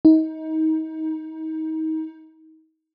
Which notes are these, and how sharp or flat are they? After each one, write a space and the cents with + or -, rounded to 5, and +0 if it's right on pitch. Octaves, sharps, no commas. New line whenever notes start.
D#4 +30